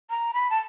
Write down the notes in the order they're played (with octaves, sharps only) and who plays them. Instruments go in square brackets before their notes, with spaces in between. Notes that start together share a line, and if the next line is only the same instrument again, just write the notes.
[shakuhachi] A#5
B5
A5